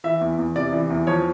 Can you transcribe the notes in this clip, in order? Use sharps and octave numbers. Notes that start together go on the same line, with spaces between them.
E3 E5
E2
E2
C3 D5
E3
E2
F3 C#5